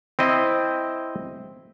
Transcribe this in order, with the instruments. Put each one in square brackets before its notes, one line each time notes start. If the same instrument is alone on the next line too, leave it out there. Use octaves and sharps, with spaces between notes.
[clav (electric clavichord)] C4 E4 D#5